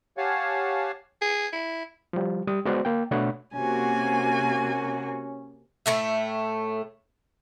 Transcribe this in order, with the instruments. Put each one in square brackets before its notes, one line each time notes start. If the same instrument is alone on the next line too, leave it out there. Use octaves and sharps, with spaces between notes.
[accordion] G4 C#5 F5 F#5 G#5 A5
[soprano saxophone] G#4
E4
[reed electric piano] F3 G3
G3 D#6
G#3 B3 F#4 B4 C5 D5
A#3 G5
B2 A3 D4 C#5 F#5 B5
[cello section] C3 A#3 F#4 [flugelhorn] C#4 [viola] G#5
[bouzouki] A2 A3 E5